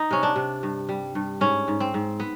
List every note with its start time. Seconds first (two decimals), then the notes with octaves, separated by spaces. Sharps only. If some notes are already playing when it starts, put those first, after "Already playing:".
Already playing: D#4
0.11 C3 C#4
0.23 D4
0.36 C3
0.63 G2
0.89 G3
1.15 G2
1.41 G#2 C#4
1.68 G#2
1.80 C4
1.94 G#2
2.20 B3